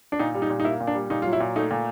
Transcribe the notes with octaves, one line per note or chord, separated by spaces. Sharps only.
D4
A#2 D#4
G3
D#4
A#2
D#4
A#3 E4
A#2
D4
G3
A#2 D#4
F#3 F4
E4
A#2
A3 D#4
A#2